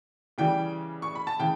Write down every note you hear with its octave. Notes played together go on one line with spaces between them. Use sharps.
C#3 E3 G3 G5
C#6
B5
A5
C#3 E3 G5